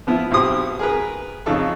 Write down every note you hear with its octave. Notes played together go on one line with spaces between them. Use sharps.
F3 B3 E4
B1 C4 G4 C6 D#6
G#4 A#4 B4
F2 C#3 D#4 A4 C#6